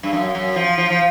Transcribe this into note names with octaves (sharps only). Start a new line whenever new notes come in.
G2
F#2
F#2
F3
F3
F3